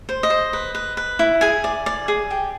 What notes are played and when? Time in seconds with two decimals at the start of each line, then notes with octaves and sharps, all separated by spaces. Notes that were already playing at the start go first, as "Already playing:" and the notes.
0.09 C5
0.23 D#5
0.30 C5
0.53 B4
0.75 B4
0.97 B4
1.19 E4
1.41 G#4 G#5
1.64 D5
1.86 D5
2.08 G#4
2.31 G4